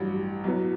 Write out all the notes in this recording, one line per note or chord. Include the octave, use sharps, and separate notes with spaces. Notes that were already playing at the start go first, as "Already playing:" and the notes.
Already playing: A1 G2 F#3
B1 A2 F#3 B3